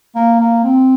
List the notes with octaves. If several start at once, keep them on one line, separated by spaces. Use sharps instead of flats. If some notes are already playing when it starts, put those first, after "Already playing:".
A#3
A#3
C4